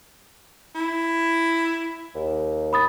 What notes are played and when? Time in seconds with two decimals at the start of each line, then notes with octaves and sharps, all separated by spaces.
0.75 E4
2.15 D#2
2.73 B5 D#6 A6